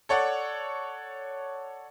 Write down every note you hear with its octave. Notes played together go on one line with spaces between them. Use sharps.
A4 C#5 D5 F#5